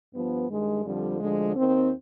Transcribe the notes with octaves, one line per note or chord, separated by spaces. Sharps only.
G2 F3 B3
G2 D#3 G#3
F2 D3 F3 G3
D2 D3 F3 G#3
D#2 D#3 C4